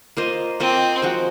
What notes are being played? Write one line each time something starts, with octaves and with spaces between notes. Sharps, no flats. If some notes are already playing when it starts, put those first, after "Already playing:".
A#3 F4 C5 D#5
A#3 C4 F4 C5 D#5
F3 G#3 C4 F#4